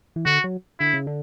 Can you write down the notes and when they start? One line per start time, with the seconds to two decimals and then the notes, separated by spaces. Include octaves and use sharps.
0.16 E3
0.26 D3 F#4
0.44 F#3
0.80 D3 E4
0.94 C#3
1.07 D3